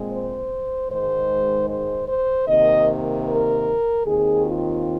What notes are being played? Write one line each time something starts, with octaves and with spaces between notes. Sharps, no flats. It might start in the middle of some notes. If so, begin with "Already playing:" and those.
Already playing: A#2 G#3 C4
C5
G#2 D#3 G#3 C5
C5
C5
C3 D#3 A#3 D#5
A#4
D#2 D#3 C4 G#4
F4